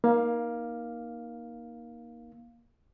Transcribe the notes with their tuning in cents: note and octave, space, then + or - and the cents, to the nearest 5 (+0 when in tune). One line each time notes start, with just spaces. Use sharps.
A#3 +20 D#4 +0 F5 +0